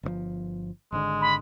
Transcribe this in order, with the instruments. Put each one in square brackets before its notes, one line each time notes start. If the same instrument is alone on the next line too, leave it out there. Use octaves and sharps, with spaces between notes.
[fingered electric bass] G1 C3 F3
[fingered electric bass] G#1 D3 [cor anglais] G#3
[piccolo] B5